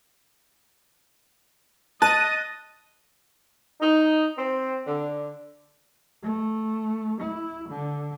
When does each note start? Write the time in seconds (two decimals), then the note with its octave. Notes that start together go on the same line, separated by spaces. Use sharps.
2.02 D#5 A5 F#6 A6 D#7
3.81 D#4
4.38 C4
4.87 D3
6.23 A3
7.21 E4
7.69 D3